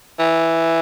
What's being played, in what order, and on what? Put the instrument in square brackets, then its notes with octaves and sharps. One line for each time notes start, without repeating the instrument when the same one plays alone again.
[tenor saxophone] E3